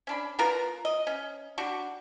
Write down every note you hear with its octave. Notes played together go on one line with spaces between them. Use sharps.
C#4 D4 B5
B3 F4 A#4 A#5
D#5
C#4
G3 D4 F#4